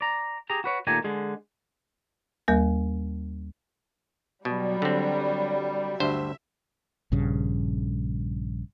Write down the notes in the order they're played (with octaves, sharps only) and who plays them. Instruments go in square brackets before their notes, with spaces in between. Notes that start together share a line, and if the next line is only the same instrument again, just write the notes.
[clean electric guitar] D5 A#5
G4 G#4 A#5
F#4 B4 C#5
A#2 D#3 A3 G4 G#5 A#5
D3 G#3 G#4
[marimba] D#2 G3 A#3 A#4
[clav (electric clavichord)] B2 [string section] F#3 G3
[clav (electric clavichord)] D3 C4
[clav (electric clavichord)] D2 G2 C5 [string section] E5
[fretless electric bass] A#1 G2 C#3